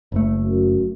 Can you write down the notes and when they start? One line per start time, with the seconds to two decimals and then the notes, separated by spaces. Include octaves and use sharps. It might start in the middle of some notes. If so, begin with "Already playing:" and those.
0.12 F#1 A3
0.42 F#2